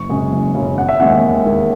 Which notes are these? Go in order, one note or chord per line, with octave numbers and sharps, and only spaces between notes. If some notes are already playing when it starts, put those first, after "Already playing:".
Already playing: F#1 C#6
F#2 C#3 G#3
F#1
F#2 C#3 G#3
E1 F#5
E5
D#2 D#3 G#3 F#5
E1
D#2 D#3 G#3